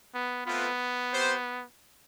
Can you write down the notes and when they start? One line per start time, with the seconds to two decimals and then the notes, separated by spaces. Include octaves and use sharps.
0.15 B3
0.46 A3 B3 C4 F4 B4
1.12 C4 G4 C5